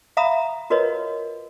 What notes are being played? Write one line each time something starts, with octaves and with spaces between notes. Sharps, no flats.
E5 F5 A#5 B5 D#6
F4 F#4 A#4 B4 C#5 D#5